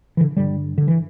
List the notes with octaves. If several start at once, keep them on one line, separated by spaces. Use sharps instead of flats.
E3
D3
G2 D3 G3
D3
E3